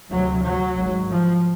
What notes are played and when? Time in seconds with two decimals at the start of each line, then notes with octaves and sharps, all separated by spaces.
0.12 D2 C3 F#3
0.45 F#3
0.77 G#1 G#2
1.10 F3